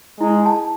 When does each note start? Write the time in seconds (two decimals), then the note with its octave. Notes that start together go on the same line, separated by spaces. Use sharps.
0.20 G#3 E4
0.46 A5